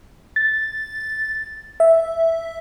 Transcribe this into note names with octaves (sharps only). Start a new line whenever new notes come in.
A6
E5